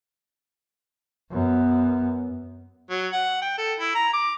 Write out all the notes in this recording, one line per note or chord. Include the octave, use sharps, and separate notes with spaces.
F#2 B3
F#3
F#5
G5
A4
E4
A#5
D6